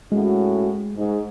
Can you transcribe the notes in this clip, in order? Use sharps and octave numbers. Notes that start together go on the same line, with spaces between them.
A2 G#3 C#4 F#4
G#2